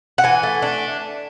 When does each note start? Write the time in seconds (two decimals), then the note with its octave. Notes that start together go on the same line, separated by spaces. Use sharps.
0.18 F#5
0.24 E3 G#5
0.43 A3
0.62 D4